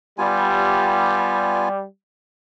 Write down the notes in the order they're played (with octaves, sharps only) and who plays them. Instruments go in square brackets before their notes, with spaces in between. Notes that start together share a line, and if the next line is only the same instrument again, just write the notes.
[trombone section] G3 [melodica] B3 F4 G#5